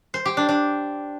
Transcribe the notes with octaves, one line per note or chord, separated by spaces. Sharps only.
C5
G4
D4
D4